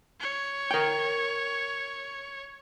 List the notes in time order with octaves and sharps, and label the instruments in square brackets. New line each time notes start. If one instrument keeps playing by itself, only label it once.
[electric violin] C#5
[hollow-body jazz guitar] A#4 G5